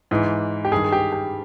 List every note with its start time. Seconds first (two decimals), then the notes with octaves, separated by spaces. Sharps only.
0.11 G#2 E3
0.65 G4
0.72 G2 D#3 G#4
0.85 G#4
0.92 G4
1.13 G4